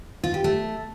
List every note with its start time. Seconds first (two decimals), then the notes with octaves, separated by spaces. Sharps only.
0.24 F4
0.34 G4
0.44 A3